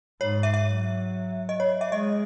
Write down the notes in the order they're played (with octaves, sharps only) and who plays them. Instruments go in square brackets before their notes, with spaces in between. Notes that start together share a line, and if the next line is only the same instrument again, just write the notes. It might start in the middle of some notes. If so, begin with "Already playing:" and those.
[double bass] G#2 [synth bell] C#5
[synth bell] E5
E5
[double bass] F#3
[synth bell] D#5
C#5
E5
[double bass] G#3 [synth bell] D#5